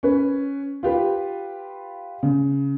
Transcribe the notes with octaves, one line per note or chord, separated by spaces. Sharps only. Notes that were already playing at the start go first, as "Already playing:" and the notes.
C#4 B4
F4 G4 B4
C#3